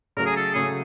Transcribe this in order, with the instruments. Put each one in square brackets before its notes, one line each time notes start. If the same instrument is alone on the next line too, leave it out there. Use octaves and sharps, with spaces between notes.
[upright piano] C#3 F#3 A3 [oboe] A#4
[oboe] G#4
A4
[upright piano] C#3 F#3 A3 [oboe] G#4